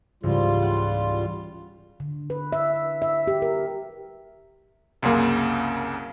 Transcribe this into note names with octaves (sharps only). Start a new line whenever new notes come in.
C#2 G#2 E3 G3 F4
F#5 F#6
D3
B4
E5
E5
G4
A#4
C2 F#2 C#3 A#3